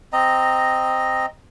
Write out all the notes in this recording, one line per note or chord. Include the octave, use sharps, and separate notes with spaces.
C4 D#5 A#5